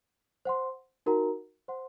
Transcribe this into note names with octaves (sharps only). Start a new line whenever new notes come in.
C5 F#5 C6
D#4 F#4 A#4 F#5 A#5
C5 F#5 C6